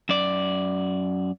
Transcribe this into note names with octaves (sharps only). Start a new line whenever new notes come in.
F#2 D5